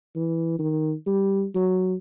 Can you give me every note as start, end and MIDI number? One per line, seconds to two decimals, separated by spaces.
0.15 0.55 52
0.59 0.93 51
1.06 1.45 55
1.55 1.94 54